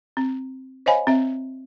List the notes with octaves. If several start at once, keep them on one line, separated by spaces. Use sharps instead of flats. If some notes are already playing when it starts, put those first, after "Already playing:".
C4
C5 C#5 D#5 F5 G#5 B5
C4 E5